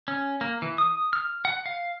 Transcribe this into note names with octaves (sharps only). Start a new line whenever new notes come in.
C#4
A#3
E3
D#6
F6
F#5
F5